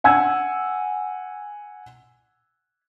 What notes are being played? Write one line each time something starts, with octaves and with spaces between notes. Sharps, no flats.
F#5 G#5 E6 G#6